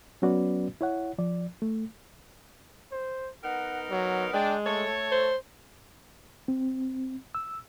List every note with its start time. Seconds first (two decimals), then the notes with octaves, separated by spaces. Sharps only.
0.22 F#3 B3 C#4 F#4 B4 D5
0.81 E4 C#5 F#5
1.18 F3 D5
1.62 A3
2.92 C5
3.44 B3 D#4 A#4 F#5
3.90 F#3
4.34 G#3 D4 G5
4.66 A3 A4 C#5
5.12 C5
6.48 C4
7.35 E6